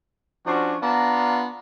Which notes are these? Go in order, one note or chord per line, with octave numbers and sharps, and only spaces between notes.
F3 C#4 D4 F#4
B3 D4 F4 A#5